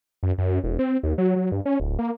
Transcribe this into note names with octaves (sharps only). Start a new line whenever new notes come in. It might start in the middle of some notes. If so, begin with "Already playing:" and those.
F#2
F#2
E1
C4
D#2
F#3
F#3
G2
C#4
D1
A#3